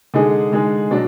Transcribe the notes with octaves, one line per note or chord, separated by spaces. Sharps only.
D3 G#3 D#4 G#4
D3 G#3 D#4 G#4
B2 F#3 D4